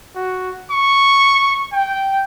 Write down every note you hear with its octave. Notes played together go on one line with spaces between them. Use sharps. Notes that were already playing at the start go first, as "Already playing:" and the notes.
F#4
C#6
G5